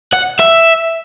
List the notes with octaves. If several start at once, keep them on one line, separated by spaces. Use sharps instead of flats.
F#5
E5